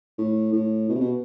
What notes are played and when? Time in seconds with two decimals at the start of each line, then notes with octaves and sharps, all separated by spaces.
0.18 A2
0.53 A2
0.89 B2
0.95 C3
1.00 B2